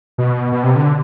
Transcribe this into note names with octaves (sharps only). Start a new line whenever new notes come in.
B2
B2
C3
D3